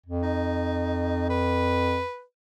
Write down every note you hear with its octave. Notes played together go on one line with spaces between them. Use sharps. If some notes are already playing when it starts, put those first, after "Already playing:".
F2
D#4
B4